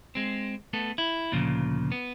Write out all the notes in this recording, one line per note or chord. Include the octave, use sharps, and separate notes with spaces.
G#3 C4
A3 B3 A4
E4
D2 A#2 C#3 F3
B3